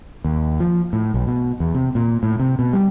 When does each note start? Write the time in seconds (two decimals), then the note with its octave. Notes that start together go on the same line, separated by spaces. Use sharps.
0.24 D#2
0.60 F3
0.93 A2
1.14 B1
1.27 B2
1.60 E2
1.75 C3
1.95 A#2
2.23 A2
2.40 C3
2.59 B2
2.73 G3